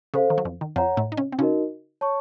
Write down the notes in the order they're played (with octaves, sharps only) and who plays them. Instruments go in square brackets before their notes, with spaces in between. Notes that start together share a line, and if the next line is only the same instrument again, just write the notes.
[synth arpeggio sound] C#3 [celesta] A4 C5 F5
[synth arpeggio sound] D#3
F#3
F2 F3
D#3
[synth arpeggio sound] F2 F3 [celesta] C#5 F#5 A#5
[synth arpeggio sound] A2 A3
D#4
C#3 C#4
C4
[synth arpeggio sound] C#3 C#4 [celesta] D#4 F#4 A#4 D#5
[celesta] C#5 A5 C#6